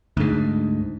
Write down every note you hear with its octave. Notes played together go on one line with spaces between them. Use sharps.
D2 G#2